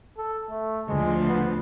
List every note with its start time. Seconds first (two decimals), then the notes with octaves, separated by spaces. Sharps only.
0.18 A4
0.50 A3
0.88 D2 F3 G#3
1.27 B3